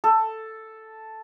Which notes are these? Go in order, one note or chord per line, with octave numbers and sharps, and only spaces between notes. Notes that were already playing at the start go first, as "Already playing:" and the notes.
A4